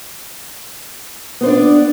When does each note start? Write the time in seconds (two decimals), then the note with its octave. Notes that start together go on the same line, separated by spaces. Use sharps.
1.41 B3
1.43 C5
1.46 D4
1.48 D5